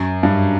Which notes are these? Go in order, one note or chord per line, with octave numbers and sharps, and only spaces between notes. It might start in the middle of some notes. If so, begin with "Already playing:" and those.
Already playing: F#2
G2